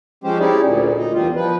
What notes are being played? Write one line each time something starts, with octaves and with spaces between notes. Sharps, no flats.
F3 G#3 C#4 G4 C5
C#4 D#4 E4 G4 G#4 D5
D2 A#2
D#4
E2 G3 F4
F3 B4